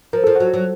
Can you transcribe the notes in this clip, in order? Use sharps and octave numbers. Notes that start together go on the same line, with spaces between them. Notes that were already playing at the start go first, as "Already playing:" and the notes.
F3 A#4
F3 A4
F#3 F#4
A4
F#3